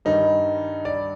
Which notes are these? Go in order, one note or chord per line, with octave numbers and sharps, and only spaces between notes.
G2 D#3 G3 D#4
D5